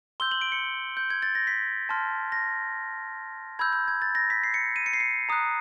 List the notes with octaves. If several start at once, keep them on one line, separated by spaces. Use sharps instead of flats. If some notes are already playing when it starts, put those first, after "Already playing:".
C6 E6 G6 G7
F#7
D7
C#7
G6
G#6
A6
A#6
B6
A5 C6 F6
A#6
B5 E6 G6 G#6
G6
G#6
A6
A#6
B6
C7
C#7
D#7
C#7
C7
C#7
A#5 D#6 F#6